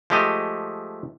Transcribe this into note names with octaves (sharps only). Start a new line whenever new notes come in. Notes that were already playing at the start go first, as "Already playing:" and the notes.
F3 G#3 A3 G4 D#5